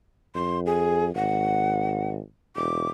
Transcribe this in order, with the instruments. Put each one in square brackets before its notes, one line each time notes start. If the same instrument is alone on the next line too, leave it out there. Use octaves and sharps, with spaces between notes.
[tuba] F2 [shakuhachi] C6
[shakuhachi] G#4
[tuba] G#1 [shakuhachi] F#5
[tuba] E1 [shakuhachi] D6